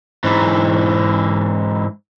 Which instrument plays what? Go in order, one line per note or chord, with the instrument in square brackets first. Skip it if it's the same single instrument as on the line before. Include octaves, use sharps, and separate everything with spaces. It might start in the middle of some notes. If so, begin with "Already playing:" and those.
[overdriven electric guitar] G#2 E3